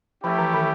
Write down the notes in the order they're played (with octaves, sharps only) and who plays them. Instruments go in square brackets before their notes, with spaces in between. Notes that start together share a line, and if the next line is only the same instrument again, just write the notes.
[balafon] F3 [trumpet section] A3 C#4 E4 G4
[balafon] E3
D#3